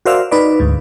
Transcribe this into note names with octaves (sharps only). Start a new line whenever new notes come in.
F#4 A#4 C5 D5 E5 F5
D#4 B4 D5
D2 G#2